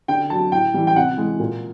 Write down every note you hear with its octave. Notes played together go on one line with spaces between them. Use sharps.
D3 G5
F#3 A5
A2 G5
E3 G3
G5
C3 F#5
E3 G#3
A#2